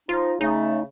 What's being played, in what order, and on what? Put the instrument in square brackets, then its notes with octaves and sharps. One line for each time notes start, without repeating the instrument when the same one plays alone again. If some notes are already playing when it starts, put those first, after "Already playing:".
[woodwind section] F3 D#4 [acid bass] F4
[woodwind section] C#3 A3 [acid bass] D#4